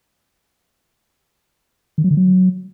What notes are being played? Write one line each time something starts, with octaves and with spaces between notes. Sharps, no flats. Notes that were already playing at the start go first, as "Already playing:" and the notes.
D#3
F#3
D3
F#3